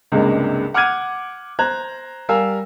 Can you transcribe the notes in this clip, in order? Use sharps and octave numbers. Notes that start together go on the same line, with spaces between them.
C#2 G2 C3 G#3 A#3
F#5 D6 F6 F#6 G#6 D#7
C5 A#5 F#6 G#6
G3 A#4 F5 G#5 E6